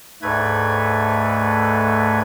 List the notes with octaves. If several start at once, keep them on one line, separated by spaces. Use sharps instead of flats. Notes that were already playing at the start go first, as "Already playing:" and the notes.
D2 G#2 A3 B4 G#6